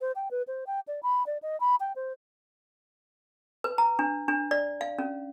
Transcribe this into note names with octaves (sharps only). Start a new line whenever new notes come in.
C5
G5
B4
C5
G5
D5
B5
D5
D#5
B5
G5
C5
B4
A#5
D4
D4
D5
F5
C#4